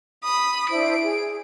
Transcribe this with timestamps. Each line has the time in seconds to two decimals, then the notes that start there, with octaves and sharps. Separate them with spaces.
0.24 B5 D#6
0.69 D4 E4 C5 D7
1.03 G#4